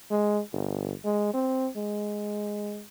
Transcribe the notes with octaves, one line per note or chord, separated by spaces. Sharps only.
G#3
G1
G#3
C4
G#3